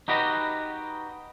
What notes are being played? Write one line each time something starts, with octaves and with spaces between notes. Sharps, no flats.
D#4 F#4 G4 B4 D#5